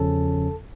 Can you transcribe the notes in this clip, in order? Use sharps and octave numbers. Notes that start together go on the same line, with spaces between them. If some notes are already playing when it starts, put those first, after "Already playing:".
Already playing: E2 C#3 F3 C#4 A4 A5